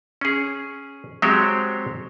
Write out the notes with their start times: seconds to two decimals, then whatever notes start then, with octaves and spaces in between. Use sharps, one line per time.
0.21 C#4 G#4
1.22 F#3 G#3 C4 G4 C5 C#5